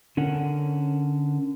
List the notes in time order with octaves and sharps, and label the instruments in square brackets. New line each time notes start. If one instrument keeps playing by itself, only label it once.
[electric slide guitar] D3 C#4 A#4 F#5